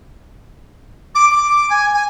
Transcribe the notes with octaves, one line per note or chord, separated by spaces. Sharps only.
D6
D6
G#5
G#5